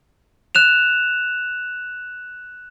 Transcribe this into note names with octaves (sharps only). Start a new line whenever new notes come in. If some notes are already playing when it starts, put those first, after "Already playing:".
F#6 E7 F7